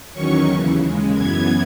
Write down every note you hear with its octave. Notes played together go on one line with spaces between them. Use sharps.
E2 D#3 F#3 C#4 C#6
D#2 C#3 E3
D#2 C#3 G#3
F#2 E3 B3 G#6